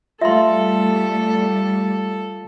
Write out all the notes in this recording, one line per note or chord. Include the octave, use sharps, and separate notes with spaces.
G3 A3 F4 A4 E5 F5 C6